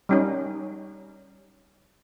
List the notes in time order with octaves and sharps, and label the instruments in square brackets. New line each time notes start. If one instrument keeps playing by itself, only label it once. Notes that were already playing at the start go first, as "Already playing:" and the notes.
[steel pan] G3 C#4 D#4